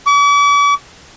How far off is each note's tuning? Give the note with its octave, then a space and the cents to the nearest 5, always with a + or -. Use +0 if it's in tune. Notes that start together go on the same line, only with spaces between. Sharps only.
D6 -45